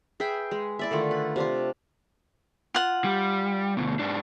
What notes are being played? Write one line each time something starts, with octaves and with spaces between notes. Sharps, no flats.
G#4 B4 E5 G5
G#3
E4 D5 E5
D3 D#3 A3 F4
B4
C3 D4 F4
F4 F#5
G3
D2 B2
G#2 D4